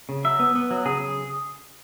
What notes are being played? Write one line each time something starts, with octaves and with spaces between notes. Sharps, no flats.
C#3
F#3 E5
B3
B3
F#3
C#3 G#4